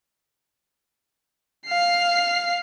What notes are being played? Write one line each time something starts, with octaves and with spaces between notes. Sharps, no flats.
F5 C7